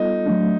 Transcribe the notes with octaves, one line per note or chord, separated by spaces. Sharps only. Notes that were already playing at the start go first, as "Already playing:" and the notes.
Already playing: G3 B3 D#4 F4 A4
F#3 A3 D4